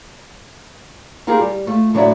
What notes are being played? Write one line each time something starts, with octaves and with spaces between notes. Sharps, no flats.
D#4 F4 G4 G#4 A#4
G3
A3 F4 A4
A2 D3 F#3 F#4 D5 E5